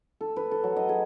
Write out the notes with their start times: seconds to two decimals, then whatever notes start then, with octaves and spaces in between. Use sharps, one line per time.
0.21 A4
0.36 B4
0.51 A4
0.64 F#3
0.76 D#5
0.89 G#4